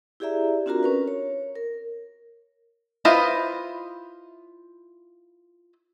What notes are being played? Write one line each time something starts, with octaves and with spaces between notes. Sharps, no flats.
E4 G4 G#4 D5 E5 A#5
C4 D4 F4 F#4 A#4 A#5
C#4 A#4 B4
C#5
A#4
E4 F4 B4 C5 D#5